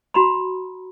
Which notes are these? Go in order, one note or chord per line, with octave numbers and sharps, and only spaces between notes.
F#4 A#5 B5